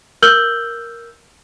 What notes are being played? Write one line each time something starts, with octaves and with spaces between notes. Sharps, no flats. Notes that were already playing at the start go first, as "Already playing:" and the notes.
A#4 E6 F6 G6 F#7 G7